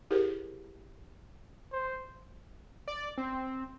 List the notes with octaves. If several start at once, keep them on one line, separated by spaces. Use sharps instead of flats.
E4 G4 G#4 A#4 C5
C5
D5
C4